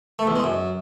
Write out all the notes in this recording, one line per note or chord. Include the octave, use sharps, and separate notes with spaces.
A3
E2
G#3
F#2